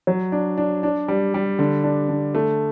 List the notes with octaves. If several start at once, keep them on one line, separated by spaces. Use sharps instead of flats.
F#3
D4
D4
D4
G3
G3
D3
D4
D3
A3